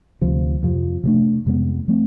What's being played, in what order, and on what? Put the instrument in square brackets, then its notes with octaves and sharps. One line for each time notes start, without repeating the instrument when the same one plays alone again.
[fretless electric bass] D2 C3 F3
F2 C3 F3
C3 F3 A3 D4
F2 C3 G#3 B3
F3 A3 C4